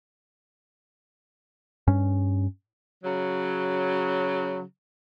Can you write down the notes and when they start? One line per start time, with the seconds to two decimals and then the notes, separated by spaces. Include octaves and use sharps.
1.87 G2 C#4
3.04 C#3 F#3